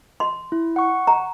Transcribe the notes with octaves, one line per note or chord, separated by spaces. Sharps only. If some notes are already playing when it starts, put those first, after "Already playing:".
C6
E4
F#5 C#6
A#5